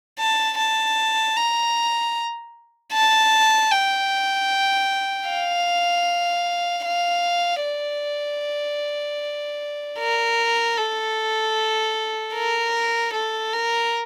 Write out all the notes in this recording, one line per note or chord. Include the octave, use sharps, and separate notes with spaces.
A5
A5
A#5
A5
G5
F5
F5
D5
A#4
A4
A#4
A4
A#4